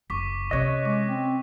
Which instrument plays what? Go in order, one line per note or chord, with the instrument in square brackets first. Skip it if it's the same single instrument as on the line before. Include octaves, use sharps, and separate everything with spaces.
[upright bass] F#1 [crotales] C#6 D6 B6
[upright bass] C3 C#4 [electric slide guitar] C#5 D#5 [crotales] C#6 F#6
[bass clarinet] G#3 [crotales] D6
[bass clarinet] C4